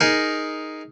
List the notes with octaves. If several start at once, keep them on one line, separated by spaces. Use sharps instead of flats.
D#4 G#4 A#4